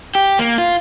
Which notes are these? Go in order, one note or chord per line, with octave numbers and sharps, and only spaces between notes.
G4
A#3
F4